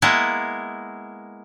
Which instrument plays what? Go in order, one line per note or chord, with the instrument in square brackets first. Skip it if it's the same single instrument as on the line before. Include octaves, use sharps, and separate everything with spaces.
[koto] G#3 A#3 B3 E4